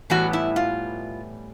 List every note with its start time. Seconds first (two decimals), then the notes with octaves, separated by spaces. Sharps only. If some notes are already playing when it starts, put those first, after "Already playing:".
0.10 A2 E3 G3 B3 F#4
0.33 E4
0.56 F4